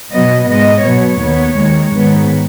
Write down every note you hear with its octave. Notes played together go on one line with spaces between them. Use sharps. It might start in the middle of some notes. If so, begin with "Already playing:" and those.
B2 F#3 B3 D#5
G#2 G#3 B3 D#5
B2 F#3 B3 C#5
D#2 D#3 B3
D#2 D#3 G#3
G#2 D#3 B3